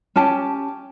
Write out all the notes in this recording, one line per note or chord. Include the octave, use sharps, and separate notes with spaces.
C#4 G4 A5